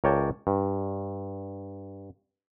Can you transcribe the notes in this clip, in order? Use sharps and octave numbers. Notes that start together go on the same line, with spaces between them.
C#2 A#4 C#5 D5 G5 A5
G2